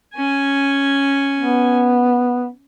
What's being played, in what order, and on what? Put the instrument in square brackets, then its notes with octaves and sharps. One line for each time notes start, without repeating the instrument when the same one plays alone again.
[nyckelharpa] C#4 G#5
[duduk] B3